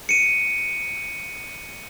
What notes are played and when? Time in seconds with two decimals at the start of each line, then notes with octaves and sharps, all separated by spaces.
0.09 C#7 D#7